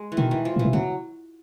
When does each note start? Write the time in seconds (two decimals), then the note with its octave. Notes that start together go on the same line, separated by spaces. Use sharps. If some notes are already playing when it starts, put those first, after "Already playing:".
Already playing: G#3
0.12 E3
0.17 B2 D#3
0.31 E3
0.45 F3
0.56 A#2 E3
0.65 B2
0.73 C3 F#3